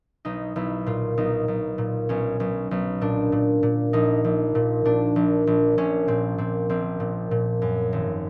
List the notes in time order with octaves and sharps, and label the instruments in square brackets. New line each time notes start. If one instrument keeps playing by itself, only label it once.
[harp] B1 D#4
B1 E4
A#2 F4
B1 D#4
B1
A#2
B1 C#4
B1
B1
A#2 D4
A#2
A#2
A#1 D#4
A#1
A#2
A#2 D4
A#1
A#1
A#1 C#4
A#2 C4
A#2 C4
A#1 C4
A#2
A#2
F#2
G#1